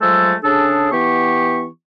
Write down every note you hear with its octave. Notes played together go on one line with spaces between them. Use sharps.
F3 F#3 G#3 A3 A4
C#3 D4 G#4 A4
E3 B3 G4 C#6